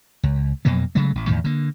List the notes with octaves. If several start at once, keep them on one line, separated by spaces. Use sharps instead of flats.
C#2
F2 B2 F#3 A#3
C#3 F#3 G#3 A3
A1
E2 A2 D#3
D3 A#3